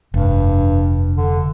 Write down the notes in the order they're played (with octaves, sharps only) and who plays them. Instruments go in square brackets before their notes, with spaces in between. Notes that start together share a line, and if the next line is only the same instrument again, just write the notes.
[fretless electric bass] F1 [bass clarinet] G2
[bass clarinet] D3